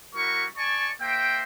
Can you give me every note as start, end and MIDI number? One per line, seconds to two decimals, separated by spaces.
0.15 0.45 55
0.15 0.45 64
0.15 0.45 66
0.15 0.45 70
0.15 0.45 85
0.57 0.90 74
0.57 0.90 80
0.57 0.90 81
0.57 0.90 85
1.01 1.43 58
1.01 1.43 72
1.01 1.43 76
1.01 1.43 79